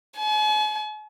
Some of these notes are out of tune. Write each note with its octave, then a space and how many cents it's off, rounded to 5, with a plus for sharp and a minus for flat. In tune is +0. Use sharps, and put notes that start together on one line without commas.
G#5 +45